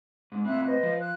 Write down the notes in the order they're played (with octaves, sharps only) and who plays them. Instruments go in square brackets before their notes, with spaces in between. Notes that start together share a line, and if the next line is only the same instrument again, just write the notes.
[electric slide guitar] G#2
[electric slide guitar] A2 C3 C4 [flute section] E5 B5 F#6
[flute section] B4 C5 D#5
[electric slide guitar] F3
[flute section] F#6